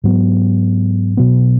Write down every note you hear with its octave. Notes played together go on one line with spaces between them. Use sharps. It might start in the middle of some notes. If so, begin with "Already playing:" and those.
G#2 F#3 B3
B2 F#3 B3